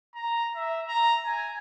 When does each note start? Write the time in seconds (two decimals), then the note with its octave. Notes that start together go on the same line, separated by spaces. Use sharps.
0.15 A#5
0.56 E5
0.87 A#5
1.25 G#5